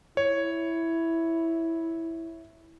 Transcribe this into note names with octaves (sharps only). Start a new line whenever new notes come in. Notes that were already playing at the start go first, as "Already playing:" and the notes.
E4 C#5